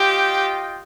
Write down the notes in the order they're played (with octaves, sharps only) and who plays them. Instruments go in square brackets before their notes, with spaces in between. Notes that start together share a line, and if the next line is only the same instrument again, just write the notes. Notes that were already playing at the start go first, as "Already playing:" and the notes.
Already playing: [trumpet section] F4 D#5 G5 [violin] G4